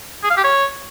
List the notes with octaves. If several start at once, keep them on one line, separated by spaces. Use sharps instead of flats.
G#4
F5
G4
C#5